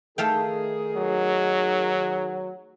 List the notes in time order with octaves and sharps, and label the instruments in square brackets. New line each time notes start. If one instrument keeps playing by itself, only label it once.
[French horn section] D#3 G#4 [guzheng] A3 F5 G5
[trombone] F#3